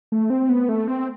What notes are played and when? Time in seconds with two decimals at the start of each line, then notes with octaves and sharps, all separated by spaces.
0.12 A3
0.30 C4
0.49 B3
0.69 A3
0.88 C4